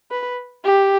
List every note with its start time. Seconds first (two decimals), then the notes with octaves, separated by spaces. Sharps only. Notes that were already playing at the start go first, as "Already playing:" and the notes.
0.11 B4
0.65 G4